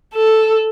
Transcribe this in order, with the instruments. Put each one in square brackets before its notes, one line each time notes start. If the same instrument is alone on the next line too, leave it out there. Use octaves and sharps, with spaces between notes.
[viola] A4